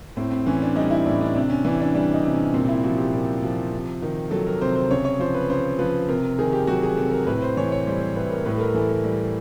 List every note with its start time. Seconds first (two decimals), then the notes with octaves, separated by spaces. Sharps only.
0.17 A2 C4
0.32 C4
0.46 E3 C#4
0.62 D4
0.76 G3 D#4
0.91 E4
1.05 A2 D4
1.21 D4
1.35 C3 D4
1.50 C#4
1.65 E3 D4
1.80 D4
1.94 G3 D4
2.14 D#4
2.24 C3
2.34 C#4
2.54 A#2 C4
2.69 E4
2.84 F3 F#4
2.98 G4
3.13 A#2
3.43 F3
3.72 C3
4.02 D#3
4.31 F#3 A4
4.47 A#4
4.61 C3 C5
4.76 C5
4.90 C#3 C#5
5.05 C#5
5.19 F3 C5
5.35 B4
5.50 C#3 C5
5.79 F3 B4
6.09 C3 A#4
6.39 D#3 G#4
6.53 G4
6.67 F#3 F#4
6.83 G#4
6.97 C3 A4
7.12 A#4
7.27 A2 B4
7.42 C5
7.57 E3 C#5
7.72 C#5
7.87 G3 C5
8.01 C5
8.16 A2 B4
8.31 A#4
8.45 A2 B4
8.56 A4
8.60 A#4
8.74 E3 A4
8.89 A#4
9.05 G3